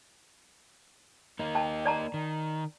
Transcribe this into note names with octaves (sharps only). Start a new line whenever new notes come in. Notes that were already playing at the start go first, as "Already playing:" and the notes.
A#3 D#4
G5 A5
D5 A5 A#5
D#3